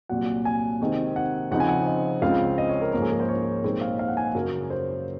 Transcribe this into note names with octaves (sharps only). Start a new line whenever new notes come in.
C2 A#2 F#3 F#5
G#5
C3 D#3 G#3 C4 D#4
F#5
C#3 F3 C4 D#4 F#5
G#5
F#5
D#5
C#2 C#3 G#3 C4 F4 F5
D#5
C#5
A#4
G#2 F3 A#3 C#4 A#4
G#4
A#4
C5
C#5
C2 A#2 G#3 C4 D#4 C#5
F5
F5
F#5
G#5
F#2 C#3 F#3 A#4
C5